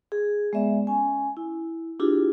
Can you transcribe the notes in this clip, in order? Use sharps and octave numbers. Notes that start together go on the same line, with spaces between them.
G#4
G#3 B3 D5 E5
C#4 G#5
E4
D4 E4 F4 G4 G#4